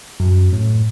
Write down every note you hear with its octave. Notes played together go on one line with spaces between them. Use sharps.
F#2
A2